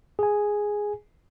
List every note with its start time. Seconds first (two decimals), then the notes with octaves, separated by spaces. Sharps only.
0.19 G#4 G#5